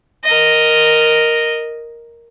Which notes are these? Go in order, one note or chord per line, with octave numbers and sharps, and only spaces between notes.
A#4 D#5